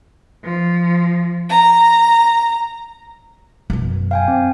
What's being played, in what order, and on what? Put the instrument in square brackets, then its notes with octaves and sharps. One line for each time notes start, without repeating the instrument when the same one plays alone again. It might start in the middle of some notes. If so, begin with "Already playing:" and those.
[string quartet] F3
A#5
[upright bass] F#2 B2
[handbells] F5 G5 G#5
C4